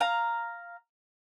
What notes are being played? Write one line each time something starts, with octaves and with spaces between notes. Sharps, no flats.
F5 A#5